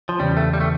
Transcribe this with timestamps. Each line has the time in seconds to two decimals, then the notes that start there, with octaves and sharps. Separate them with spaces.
0.09 F3
0.19 E2 C#3 G3 C#4
0.37 A3
0.53 G3
0.60 A3